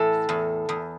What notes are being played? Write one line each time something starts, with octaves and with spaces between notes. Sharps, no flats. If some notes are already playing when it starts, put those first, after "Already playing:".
Already playing: A2 E3 A4
E2
E2